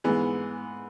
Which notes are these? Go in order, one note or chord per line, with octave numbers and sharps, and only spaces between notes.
G#2 E3 G#3 B3